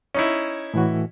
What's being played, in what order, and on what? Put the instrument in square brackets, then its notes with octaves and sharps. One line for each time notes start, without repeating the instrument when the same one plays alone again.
[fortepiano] C#4 D#4 E4
[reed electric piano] A2 E3 F#4